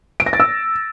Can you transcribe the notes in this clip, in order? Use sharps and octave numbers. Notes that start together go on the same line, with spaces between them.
D7
A#6
A6
E6